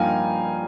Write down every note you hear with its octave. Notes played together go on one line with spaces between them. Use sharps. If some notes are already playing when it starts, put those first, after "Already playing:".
Already playing: G2 F3 A#3 D#4 F5 G5 G#5 A#5